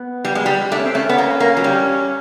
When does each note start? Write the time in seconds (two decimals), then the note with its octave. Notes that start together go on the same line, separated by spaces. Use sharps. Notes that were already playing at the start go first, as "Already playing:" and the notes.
Already playing: B3
0.25 G3
0.35 G#3
0.46 G3
0.72 A3 D4
0.79 C#4
0.86 C4
0.93 A3 C#4
1.09 B3
1.18 A#3
1.40 A#3
1.57 F#3
1.64 G3